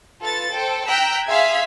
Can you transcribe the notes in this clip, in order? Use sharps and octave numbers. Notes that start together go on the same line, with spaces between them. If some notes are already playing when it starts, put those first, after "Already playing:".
F4 A4 B4 A6
A4 C5 G5
G5 A#5 E6 F#6 G6 B6
G#4 E5 F5 C6 G#6 B6